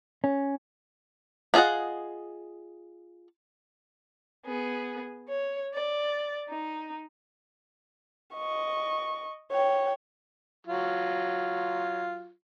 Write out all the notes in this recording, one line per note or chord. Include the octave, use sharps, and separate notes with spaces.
C#4
B3 F4 G#4 D#5 F#5
B3 G#4
C#5
D5
D#4
D#5 C#6
C#5 G5
F#3 F4